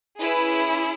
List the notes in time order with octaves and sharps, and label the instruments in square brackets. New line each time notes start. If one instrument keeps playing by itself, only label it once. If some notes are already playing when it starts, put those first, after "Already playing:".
[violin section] C#4 E4 G#4 B4